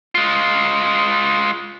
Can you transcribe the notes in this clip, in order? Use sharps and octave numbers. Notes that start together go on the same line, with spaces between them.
G#3 F4